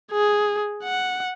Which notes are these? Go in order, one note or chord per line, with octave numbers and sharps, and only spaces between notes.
G#4
F#5